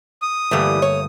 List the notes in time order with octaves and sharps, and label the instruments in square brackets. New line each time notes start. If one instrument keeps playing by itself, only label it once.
[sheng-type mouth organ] D#6
[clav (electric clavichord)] G1 A3 A#3 [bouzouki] E3 G3
[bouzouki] C#5